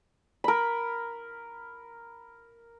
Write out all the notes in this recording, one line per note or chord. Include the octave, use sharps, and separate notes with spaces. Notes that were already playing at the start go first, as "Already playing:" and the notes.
A#4 B5